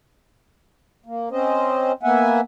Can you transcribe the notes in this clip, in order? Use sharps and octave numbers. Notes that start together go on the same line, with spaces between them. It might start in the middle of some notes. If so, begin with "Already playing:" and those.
A#3
C4 C#4 C5 D#5
A#3 B3 E5 F#5 G#5